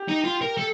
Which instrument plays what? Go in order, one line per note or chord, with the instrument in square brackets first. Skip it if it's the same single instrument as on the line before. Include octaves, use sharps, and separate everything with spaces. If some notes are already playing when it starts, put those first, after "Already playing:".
Already playing: [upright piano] G4
[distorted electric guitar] D#4
F4
A#4
A4